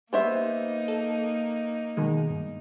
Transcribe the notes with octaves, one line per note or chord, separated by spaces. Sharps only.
A#3 B3 D#4 G4 C5 E5
A4
B2 D#3 G#3
G2